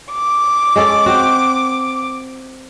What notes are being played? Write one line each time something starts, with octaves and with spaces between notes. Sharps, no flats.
D6
G#3 C#4 A4
C4 F#4